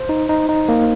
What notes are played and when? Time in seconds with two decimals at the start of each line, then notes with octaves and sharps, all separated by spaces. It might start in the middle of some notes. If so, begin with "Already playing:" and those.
Already playing: C5
0.09 D#4
0.29 D#4
0.49 D#4
0.69 A#3